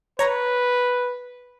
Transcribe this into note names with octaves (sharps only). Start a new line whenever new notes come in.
B4 C#5 A#5